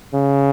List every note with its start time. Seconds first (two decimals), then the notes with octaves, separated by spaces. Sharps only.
0.14 C#3